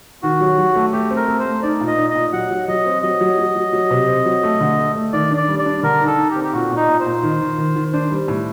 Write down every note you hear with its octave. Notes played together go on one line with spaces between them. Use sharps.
D#3 F#4
F#3
F#3
A3
A3 G4
C4
A#4
A3
C5
A3
D#4 D5
A#2
D#5
D#4
D#5
A#2
F#3 F#5
F#3
F#3 D#5
C4
F#3 D#5
F#3
F#3
F#3
F#3
C3
C4
F#3
A3
D3
A3
A3
D#3 D5
D4
D5
G3
D5
D4
D3 A#4
D#4
A4
D#4
G4
C4
G4
A#2 F#4
A#2
D#4
A#2
C5
A#2
D#3
D#3
D#3
D#3
D4 C5
G3
A2